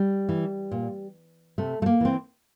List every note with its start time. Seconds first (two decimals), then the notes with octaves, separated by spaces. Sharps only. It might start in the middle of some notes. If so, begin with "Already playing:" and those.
Already playing: G3
0.29 E3
0.71 A#2
1.58 C3 A3
1.82 A3
1.86 A#3
2.01 E3 C4